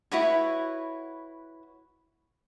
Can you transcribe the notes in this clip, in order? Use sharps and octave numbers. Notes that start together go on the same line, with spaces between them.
E4 F#4 B4 C#5